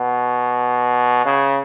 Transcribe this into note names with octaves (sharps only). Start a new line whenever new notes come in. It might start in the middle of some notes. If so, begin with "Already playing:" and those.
Already playing: B2
C#3